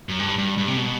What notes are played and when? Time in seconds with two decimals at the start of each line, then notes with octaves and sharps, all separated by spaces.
0.09 F#2
0.20 G2
0.38 G2
0.58 G2
0.68 C3
0.77 B2